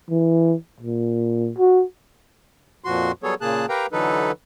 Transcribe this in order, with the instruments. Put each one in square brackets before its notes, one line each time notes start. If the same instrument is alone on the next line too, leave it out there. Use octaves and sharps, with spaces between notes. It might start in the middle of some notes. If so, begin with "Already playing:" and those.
[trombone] E3
A#2
F#4
[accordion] F2 A#2 F3 F#4 C6
F#3 G3 B3 G#4 A4 C#5
A#2 C#3 A#3 G#4 A5 F#6
G4 A#4 B4 F5 G5 A#5
D3 E3 F#3 D#4 A4 B4